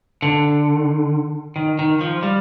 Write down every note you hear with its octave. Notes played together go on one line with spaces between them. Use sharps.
D3
D#3
D#3
F3
G3